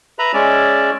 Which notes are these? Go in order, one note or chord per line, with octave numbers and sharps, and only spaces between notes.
B4 E5 A#5 B5
G#3 C#4 D5 E5